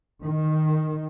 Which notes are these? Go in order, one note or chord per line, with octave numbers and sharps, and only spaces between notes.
D#3